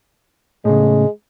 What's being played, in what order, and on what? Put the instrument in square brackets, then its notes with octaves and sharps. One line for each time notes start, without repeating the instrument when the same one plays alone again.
[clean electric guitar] A2 C#3 [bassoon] G#3